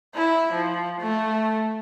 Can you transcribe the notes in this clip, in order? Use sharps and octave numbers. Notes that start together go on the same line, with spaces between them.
E4
F3
A3